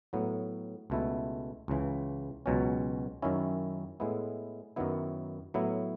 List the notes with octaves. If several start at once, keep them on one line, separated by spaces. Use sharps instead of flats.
A2 F#3 B3
C#2 B2 A3 E4
C#2 C#3 E3
C#2 B2 F#3 C#4
F#2 D#3 F#3 C#4 E4
A2 G#3 B3 E4
F#2 D#3 F#3 B3 E4
A2 F#3 B3 E4